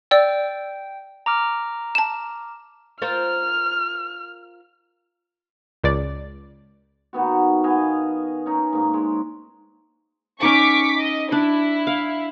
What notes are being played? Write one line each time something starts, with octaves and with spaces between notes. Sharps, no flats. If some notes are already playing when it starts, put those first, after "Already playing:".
D5 G5 E6
A#5 D6 F6
A5 E7
F4 A#4 C5 F6
C#2 D5
D#3 B3 F#4
B3 D#5 F5 G#5
C#4 D#4
G#2 A#3 D#4
G#3
C#4 D#4 C#6 D6 B6
D#5
D4 E4
F5